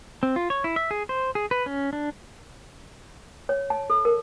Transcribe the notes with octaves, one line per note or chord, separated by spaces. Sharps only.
C4
F4
C#5
E4
E5
G#4
C5
G#4
B4
C#4
D4
C#5
A5
A4
A#4